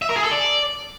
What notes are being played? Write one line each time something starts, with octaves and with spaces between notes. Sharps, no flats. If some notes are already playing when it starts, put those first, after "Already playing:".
E5
A#4
G#4
A4
D5